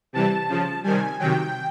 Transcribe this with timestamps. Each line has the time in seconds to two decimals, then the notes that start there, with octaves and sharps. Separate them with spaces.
0.13 C3 E3 G3 A5
0.49 C#3 F3
0.83 C3 D#3 G3 G#5
1.19 C3 D#3 F#3 G5